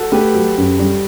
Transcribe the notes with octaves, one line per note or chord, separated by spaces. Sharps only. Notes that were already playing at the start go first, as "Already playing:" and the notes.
Already playing: F#4 A4
A3 G4 B4
F#3
F#2
G3